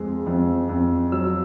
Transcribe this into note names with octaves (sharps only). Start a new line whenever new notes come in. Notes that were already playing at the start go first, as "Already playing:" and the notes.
Already playing: F2 G#3
F2
F2
F#3 E6